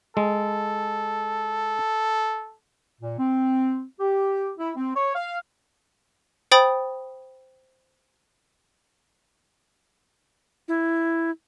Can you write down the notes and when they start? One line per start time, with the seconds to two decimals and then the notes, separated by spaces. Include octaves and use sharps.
0.17 G#3 A4
3.01 A#2
3.19 C4
4.00 G4
4.58 E4
4.76 C4
4.96 C#5
5.15 F5
6.52 C5 G5 B5 D#6 A6 F#7
10.68 E4